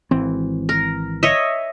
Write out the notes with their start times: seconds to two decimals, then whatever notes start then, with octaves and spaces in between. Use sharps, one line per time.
0.11 G#1 E3 C4
0.69 A#4
1.23 C#5 D#5 E5